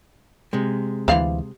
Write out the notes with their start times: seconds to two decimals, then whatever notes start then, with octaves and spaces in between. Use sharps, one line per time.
0.53 C3 G#3
1.08 D2 E3 C5 D5 F5